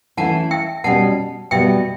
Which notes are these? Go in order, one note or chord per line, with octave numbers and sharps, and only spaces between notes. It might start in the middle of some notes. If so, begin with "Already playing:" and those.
E3 A3 C#4 E4 F#5 A5
E5 G5
B2 G3 C#4 F#5 A5
B2 G3 B3 E5 G5